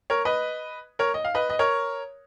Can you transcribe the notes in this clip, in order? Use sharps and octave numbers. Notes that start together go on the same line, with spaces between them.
A#4 C#5
B4 D#5
A#4 C#5
D#5
F5
B4 D#5
D#5
A#4 C#5